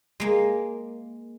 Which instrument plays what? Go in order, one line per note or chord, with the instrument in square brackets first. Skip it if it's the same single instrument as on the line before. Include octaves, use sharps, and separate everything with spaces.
[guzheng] G#3 A#3